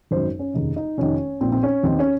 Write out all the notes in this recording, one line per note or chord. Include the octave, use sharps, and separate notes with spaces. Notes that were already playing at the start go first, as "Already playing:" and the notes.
G#1 F#2 D#3 C5
C#4
F1 D#2 C#3 D#4
D#4
F1 F2 C3 D#3 C#4
A#1 A#2 C4
C4
C#4
D#2 D#3 C4
C#4